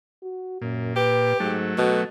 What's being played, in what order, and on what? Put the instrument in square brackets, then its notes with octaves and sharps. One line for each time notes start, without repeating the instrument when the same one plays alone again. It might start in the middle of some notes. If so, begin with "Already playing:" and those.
[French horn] F#4
[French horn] F#2 [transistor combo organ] A#2
[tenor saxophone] G4 [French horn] B4
[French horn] G#2 [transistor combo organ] F#3 A3
[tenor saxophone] B2 [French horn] A4